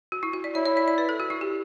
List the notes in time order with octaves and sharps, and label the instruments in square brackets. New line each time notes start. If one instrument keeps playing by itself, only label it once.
[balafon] F#4
E4
F#4
D5
[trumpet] E4 [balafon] C#5
[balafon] C#5
D5
D5
B4
A4
F#4
E4
G4